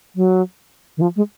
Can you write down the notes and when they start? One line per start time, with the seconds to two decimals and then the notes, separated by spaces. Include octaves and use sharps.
0.16 F#3
0.97 D#3
1.01 F3
1.16 G#3